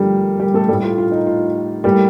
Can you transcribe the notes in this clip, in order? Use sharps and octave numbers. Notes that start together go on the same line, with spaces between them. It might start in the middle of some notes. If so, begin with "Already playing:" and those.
Already playing: G2 D3 F3 G3 A3 A#3 G4 A#4
G3 G4
A3 A4
A2 G3 A3 G4
F4
F4
D#4
F4
A2 G3 A#3 G4